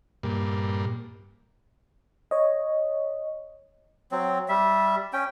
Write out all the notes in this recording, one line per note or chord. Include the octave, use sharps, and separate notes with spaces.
G2 A#2
C#5 D#5
F#3 C4
G3 E5
C#4 G5